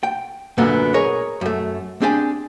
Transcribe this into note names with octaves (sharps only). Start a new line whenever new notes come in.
G5
F#2 A#2 D3 A3 B3
G#4 A#4 C#5 D#5
F#2 A3
C4 D4 G4 G#4 D5 G#5